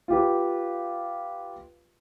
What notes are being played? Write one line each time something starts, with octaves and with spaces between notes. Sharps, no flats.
F4 G4 B4